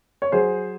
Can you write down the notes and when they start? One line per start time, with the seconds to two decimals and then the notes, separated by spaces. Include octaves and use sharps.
0.22 C#5
0.32 F#3 G#4 C5